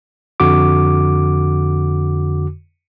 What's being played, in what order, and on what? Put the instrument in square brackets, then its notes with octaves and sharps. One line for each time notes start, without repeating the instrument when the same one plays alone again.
[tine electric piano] F2 D3 F#4 D6